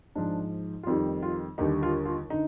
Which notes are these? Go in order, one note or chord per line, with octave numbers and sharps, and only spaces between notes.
G#2 F3 D4
F4
F2 D#3 G3 D#4
F4
D#2 D3 G3 D#4
F4
F4
D3 D#4